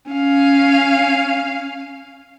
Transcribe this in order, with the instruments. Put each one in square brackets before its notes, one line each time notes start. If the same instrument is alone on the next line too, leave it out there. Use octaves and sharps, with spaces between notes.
[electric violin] C#4 F5